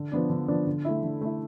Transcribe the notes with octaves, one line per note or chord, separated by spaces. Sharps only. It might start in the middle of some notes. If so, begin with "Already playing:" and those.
Already playing: D3
F3 B3 D4
D3
F3 B3 D4
D3
A3 E4
D3
A3 E4